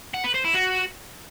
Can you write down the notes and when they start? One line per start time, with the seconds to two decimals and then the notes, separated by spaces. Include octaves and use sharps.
0.14 F#5
0.24 B4
0.34 C5
0.44 E4
0.54 F#4